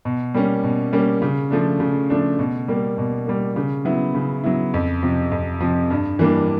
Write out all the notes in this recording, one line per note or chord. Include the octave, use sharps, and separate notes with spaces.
B2
G3 A#3 C#4
B2
G3 A#3 C#4
C#3
F3 A3 D4
C#3
F3 A3 D4
B2
G3 A#3
B2
G3 A#3
C#3
F#3 B3 E4
C#3
F#3 B3 E4
F2
C3 F3
F2
C3 F3
G2
E3 G3 A#3 D4